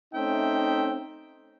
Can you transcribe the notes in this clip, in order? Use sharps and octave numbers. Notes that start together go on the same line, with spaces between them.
A3 C4 C#4 D#4 E5 G5